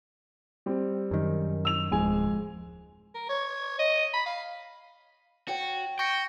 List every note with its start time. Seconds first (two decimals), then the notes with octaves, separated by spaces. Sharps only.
0.66 G3 C4
1.11 F#2 D#3
1.65 E6 F7
1.92 D1 F2 G#3 G#5
3.14 A#4
3.29 C#5
3.79 D#5
4.14 B5
4.26 F5
5.48 F#4 C#5 G5
5.99 G5 C#6 A#6 C#7